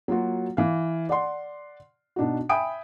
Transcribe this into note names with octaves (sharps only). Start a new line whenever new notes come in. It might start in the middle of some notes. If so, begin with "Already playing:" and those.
F#3 A#3 F4 F#4
E3 F5
D5 F#5 C6
B2 D4 D#4 F#4
E5 G5 G#5 B5 D#6 D7